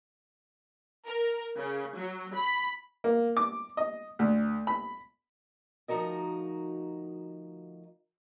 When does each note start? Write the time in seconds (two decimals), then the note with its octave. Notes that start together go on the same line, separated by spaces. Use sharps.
1.06 A#4
1.57 C#3
1.96 F#3
2.36 B5
3.04 A#3
3.37 D6
3.77 D#5
4.19 D2
4.67 B5
5.88 D2 F3 D#4 F#4 A#4 D#5